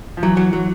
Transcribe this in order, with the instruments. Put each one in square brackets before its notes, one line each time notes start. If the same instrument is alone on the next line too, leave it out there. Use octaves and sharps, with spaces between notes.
[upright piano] F3
[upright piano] E3 [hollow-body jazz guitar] F#3
[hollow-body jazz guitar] F#3
F#3